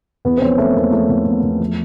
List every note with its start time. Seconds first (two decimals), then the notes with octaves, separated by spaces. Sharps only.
0.25 E2 B3
0.37 C4
0.42 F3 C#4
0.58 F3 A3
0.75 E2 A#3
0.92 F3 A3
1.09 E2
1.26 E2
1.43 E2
1.60 F3